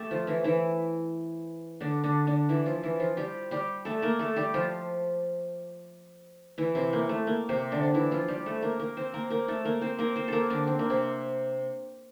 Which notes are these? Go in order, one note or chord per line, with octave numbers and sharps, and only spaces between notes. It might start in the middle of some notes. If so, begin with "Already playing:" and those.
Already playing: A3 G4 A4
F3 F4
E3 E4
E3 E4
D3 D4
D3 D4
D3 D4
E3 E4
F3 F4
E3 E4
F3 F4
G3 G4
G3 G4
A3 A4
A#3 A#4
A3 A4
G3 G4
F3 F4
E3 E4
C3 C4
A#3
A3
A#3
C3 C4
D3 D4
D4
E3 E4
F3 F4
G3 G4
A3 A4
A#3 A#4
A#3 A#4
C4 C5
A#3 A#4
A#3 A#4
A3 A4
A#3 A#4
C4 C5
A#3 A#4
C4 C5
A#3 A4 A#4
D3 D4
C4
A#3
C3 C4